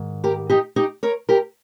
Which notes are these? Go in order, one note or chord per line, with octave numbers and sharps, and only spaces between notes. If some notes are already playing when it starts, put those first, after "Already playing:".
Already playing: G#2 D#3
G4 A#4
D#4 G4
D#4 G4
A#4 C#5
G4 A#4